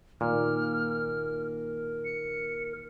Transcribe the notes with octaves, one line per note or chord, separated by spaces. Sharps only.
A#2 D#3 A#3 A#4 F6
C#7